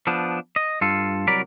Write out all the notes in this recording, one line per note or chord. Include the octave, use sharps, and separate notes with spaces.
F3 B3 D4
D#5
G2 F4 A4
C2 F#3 A#4 D5 B5